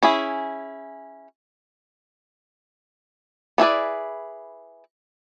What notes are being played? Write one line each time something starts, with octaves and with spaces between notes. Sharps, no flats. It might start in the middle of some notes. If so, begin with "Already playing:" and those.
C#4 E4 G#4
B3 E4 G#4 B4 D5